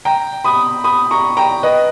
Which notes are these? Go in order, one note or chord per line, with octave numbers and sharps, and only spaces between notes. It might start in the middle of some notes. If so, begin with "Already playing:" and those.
G5 A#5
B5 D#6
B5 D#6
A#5 C#6
G5 A#5
B4 D#5